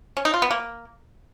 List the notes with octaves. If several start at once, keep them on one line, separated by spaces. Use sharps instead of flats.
C#4
D#4
F4
B3
A#3